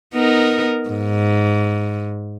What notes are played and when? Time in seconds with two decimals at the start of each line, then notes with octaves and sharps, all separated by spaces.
0.14 B3 D#4 A#4
0.89 G#2